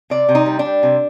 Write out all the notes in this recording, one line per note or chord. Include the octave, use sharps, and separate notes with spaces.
C3 D5
C3
D#4
G3
D4
G3
C3